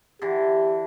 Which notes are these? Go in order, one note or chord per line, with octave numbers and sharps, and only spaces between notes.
D3 E3 G4